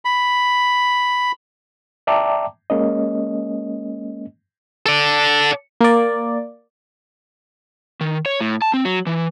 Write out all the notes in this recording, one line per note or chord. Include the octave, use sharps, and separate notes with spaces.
B5
D5 E5 G5 A5 A#5 D6
G#3 A#3 C#4 D#5
A4 D5
A#3 D5
D#3
C#5
A2
A5
C4
F#3
E3